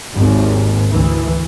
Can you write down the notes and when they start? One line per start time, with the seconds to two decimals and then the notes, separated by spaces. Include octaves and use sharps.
0.13 G#1 D#2
0.92 D2 E3